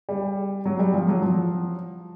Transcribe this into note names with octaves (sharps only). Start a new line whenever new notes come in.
G3
F#3
G3
F3
F#3
F3